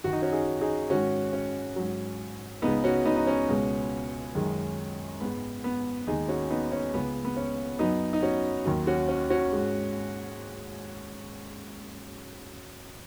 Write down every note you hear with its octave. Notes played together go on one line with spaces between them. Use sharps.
F#2 D#3 F#3 F#4
D#4
C#4 F#4
D#4 G#4
D#4 G#4
G#2 D#3 G#3 C#4 F#4
C#4
G#2 F#3
C#2 C#3 G#3 B3 D#4
C#4 F#4
B3 D#4
D#4
C#4
C#2 B2 G#3
F#2 D#3 G#3
G#2 G#3 B3
B3
D#2 D#3 G#3 D#4 G#4
C#4 F#4
B3 D#4
C#4
C#2 C#3 G#3 B3
B3
C#4
F#2 F#3 B3 D#4
D#4
C#4 F#4
D#2 D#3 F#3
C#4 F#4
C#4
C#4 F#4
G#2 G#3